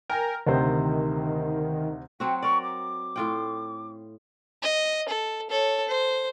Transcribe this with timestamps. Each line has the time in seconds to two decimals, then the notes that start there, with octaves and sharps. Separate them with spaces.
0.10 A#4 G5 G#5
0.47 D2 C3 D#3 C5
2.20 F#3 C4 F#4 G5
2.42 A#4 D5 C#6
2.63 D6
3.16 A2 F4 G5
4.62 D#5
5.09 A4
5.50 A4 C#5
5.88 C5